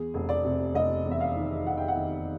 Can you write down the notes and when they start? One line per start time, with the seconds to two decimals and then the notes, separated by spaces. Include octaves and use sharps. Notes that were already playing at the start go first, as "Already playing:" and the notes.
Already playing: E2 G#4
0.14 F1
0.29 D5
0.45 C3
0.74 F1 D#5
1.06 E2
1.11 E5
1.20 F5
1.36 D#3
1.66 D#3 F#5
1.77 G5
1.88 F#5
1.97 D#3